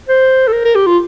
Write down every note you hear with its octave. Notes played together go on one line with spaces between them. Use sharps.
C5
A4
A#4
A#4
G4
F4